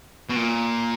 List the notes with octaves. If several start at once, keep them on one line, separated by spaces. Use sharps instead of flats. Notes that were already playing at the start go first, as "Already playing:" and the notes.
B2
A#2